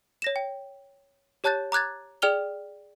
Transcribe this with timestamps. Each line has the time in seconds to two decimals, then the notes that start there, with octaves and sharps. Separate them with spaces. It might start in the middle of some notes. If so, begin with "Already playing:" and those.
0.22 C#5 A#6 E7
0.36 G5
1.44 G4 C#5 A5 F#6 G6 A6
1.72 A#5 D6 F#6 G#6 A6
2.22 G#4 D5 G5 F6 F7 G7